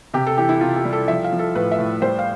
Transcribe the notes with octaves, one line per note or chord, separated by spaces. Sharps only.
C3 G4
A4
E3 G4
E4
C3 F4
G4
G3
A4
F3 E5
F5
F3
A4
A2 B4
E5
A2
G3 C5
F5